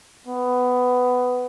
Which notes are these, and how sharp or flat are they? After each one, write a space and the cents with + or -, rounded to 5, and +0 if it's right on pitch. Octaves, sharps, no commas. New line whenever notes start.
B3 +15